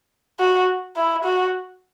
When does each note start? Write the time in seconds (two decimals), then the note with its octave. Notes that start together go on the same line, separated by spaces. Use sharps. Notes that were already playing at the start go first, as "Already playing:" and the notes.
0.40 F#4
0.96 E4
1.25 F#4